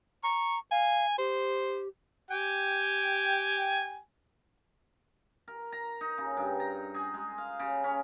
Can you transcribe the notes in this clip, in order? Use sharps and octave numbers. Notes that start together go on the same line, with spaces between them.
A#5 C#6
F5 G#5
G4 C5
G4 G5 G#5
A#4
A#5
D#4
C#3
G2
A#5
G#4
G#3
F5
C#3
C#4